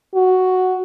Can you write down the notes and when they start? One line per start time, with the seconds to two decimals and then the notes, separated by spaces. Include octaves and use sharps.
0.15 F#4